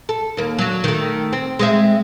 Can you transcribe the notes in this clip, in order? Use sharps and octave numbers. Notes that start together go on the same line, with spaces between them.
A4
D#2 A#3
F#3 D4
D#3 A3
C4
G#3 C4 E5